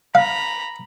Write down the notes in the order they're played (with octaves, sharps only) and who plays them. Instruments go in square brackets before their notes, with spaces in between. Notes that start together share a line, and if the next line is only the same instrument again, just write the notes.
[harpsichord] F5 [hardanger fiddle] A#5 B5